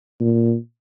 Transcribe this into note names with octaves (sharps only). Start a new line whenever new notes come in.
A#2